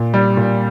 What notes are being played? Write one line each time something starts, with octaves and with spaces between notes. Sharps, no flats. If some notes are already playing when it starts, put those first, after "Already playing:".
Already playing: A#2
G3
A#2